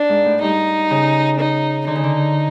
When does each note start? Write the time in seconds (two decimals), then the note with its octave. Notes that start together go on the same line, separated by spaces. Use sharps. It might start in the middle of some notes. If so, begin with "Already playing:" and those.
Already playing: D4
0.09 G#2
0.25 A2
0.42 G2 D#4
0.91 C#3
1.39 D#4
1.87 D3 D#4
1.95 C#3
2.04 D3